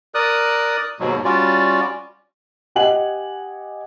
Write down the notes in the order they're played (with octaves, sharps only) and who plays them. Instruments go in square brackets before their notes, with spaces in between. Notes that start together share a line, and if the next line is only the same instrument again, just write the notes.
[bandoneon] A#4 D5 D#6 F#6
D#2 G#2 B2 F#3
G3 C#4 F4 F#4 D5
[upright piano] G4 D#5 F#5 G#5 F#7